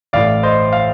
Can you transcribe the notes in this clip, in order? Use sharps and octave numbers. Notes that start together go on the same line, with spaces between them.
A1 A2 D5 F5
C5 D#5
F5